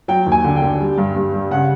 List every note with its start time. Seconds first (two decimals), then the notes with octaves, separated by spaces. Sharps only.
0.08 F#3 G5
0.26 D#2
0.32 G#5
0.44 D3
0.56 G5
0.62 D3
0.80 G3
0.98 G2
1.16 G2
1.33 G3
1.51 C#3 F#5